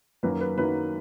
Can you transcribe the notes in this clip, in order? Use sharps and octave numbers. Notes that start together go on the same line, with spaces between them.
F#2 D#3 F#3 A#3 B4
B4
F#2 D#3 F#3 A#3 B4